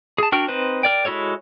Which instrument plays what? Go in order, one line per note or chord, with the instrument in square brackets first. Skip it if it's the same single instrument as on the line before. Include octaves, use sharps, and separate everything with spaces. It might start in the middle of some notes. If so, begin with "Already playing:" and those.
[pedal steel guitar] G#4 A5
D4 F#4 A#4 G5 F6
C4 D#4 B4 C5
A#4 D5 G5
G#3 E4 F#4 A4 C#5